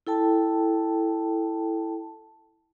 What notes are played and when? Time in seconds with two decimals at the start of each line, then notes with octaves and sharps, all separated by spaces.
0.07 E4 A4 G5 A5